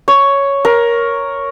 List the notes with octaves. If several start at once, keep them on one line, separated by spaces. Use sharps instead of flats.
C#5
A#4